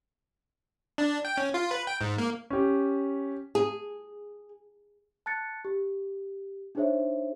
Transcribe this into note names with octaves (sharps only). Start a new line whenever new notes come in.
D4
G5
C#4
F4
B4
G5
G#2
A#3
C#4 G4
G#4
A5 F#6 A6 C#7
G4
D4 D#4 G#4 C5 C#5 E5